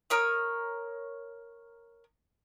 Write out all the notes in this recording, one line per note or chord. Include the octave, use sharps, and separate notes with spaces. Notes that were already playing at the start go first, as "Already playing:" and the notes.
A#4 C#5 D#6